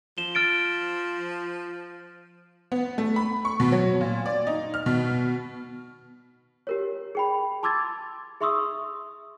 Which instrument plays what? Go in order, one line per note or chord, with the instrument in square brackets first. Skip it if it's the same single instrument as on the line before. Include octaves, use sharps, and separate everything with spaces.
[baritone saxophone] F3 [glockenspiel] E7 G7
[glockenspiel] F6 A6 D7
[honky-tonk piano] B3
A3
B5
C#6
B2
F#3
A#2
D5
D#4
F6
B2
[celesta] G4 A#4 C#5
G#4 G5 B5
A5 C6 D6 E6 G#6 A6
G#4 E5 C6 C#6 D#6 E6